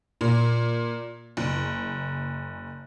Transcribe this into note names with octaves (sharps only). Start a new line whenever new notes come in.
A#2
F#1